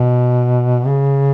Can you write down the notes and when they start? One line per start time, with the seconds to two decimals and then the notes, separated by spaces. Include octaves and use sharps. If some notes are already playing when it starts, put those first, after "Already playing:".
Already playing: B2
0.87 C#3